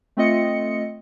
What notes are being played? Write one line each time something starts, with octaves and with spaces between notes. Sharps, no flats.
A3 C4 F4 D#5 C#7